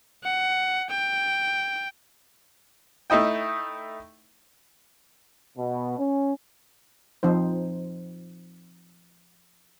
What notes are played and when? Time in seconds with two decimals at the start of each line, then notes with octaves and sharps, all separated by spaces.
0.24 F#5
0.90 G5
3.10 A3 D#4 E4 D#5 G5
5.57 B2
5.98 C#4
7.23 F3 C4 D#4 C5